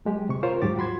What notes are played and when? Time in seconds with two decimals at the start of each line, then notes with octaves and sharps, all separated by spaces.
0.05 F#3 G#3 G4
0.29 C3 C#6
0.43 F4 A#4 C5 C#5
0.62 D#2 G#2 F#3 G4 D6 A6
0.76 F4 F#4 B5 C6 G#6